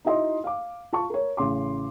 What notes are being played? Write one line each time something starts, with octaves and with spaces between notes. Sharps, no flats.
D#4 E4 F#4 D#5 E5 C6
F5 D6
F4 A5 C#6
A#4 C#5
A1 C#3 C6 D6